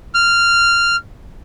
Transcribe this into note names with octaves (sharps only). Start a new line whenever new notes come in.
F6